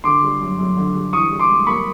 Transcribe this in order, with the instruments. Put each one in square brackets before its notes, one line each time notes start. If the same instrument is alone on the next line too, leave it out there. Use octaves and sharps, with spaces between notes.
[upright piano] D3 [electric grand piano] C6 D6
[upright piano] G3
F#2
F#2
D3
G3
[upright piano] E3 [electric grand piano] C#6 D#6
[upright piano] G3
[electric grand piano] C6 D6
[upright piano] G#2
[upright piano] A#3 [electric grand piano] B5 C#6